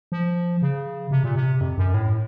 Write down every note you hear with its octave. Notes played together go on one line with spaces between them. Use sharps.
F3
C#3
C3
A#2
C3
F2
F#2
A2